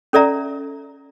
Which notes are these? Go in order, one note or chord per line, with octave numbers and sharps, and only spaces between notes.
C#4 A4 D5 E5 A#5